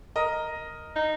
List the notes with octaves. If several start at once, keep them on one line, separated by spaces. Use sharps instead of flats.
A#4 D#5
D#4